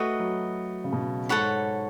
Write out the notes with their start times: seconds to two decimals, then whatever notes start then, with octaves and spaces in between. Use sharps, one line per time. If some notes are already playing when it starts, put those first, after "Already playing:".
Already playing: A3 F#4 B4 D#5
0.19 F#3
0.84 C#3
0.92 B2
1.29 G#2 A4 C#5 F#5 B5